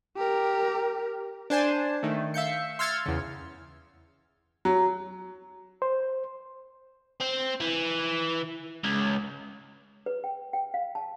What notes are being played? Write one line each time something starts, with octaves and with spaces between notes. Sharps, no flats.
G4 A#4
D4 C5 G#5 A5
D#3 A3
E5 F5 G6 C#7
C6 E6 F6 G#6 A6 C#7
E2 C#3
F#3
C5
C4
E3
C#2
B4
G5
G5
F5
A5